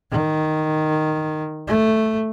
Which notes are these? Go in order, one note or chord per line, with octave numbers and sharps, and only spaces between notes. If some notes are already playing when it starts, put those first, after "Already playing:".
D#3
A3